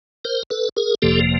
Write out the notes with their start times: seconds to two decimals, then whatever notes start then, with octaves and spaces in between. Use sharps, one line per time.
0.25 A#4 C5
0.50 A4 B4
0.77 G#4 A#4
1.02 G1 F2 C3 F3 A#3 G4 A4